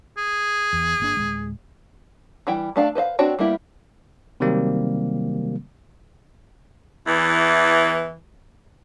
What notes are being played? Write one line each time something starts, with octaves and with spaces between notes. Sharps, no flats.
G#4
E2
G1 A#3 D4
D1 G#3
E3 G3 E4 G5
A3 D4 F5 A5
B4 C5 D#5 F5
C4 D4 F#4 C#5 G5
G3 A#3 B3 E4 G4
C3 D#3 F#3 G3 A#3 C4
E2 E3